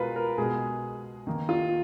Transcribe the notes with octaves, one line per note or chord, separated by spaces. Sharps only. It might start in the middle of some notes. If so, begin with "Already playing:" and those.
Already playing: B2 G#3 F4 A#4 B4
A#4
B2 G#3 G#4
D#3 A#3
F4